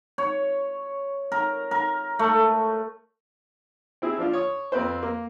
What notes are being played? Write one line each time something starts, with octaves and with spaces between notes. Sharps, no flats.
C#5
A#4
A#4
A3
C4 E4 G#4
F3 D4 F4
C#5 D#6
F2 C4 B4 C5
A#3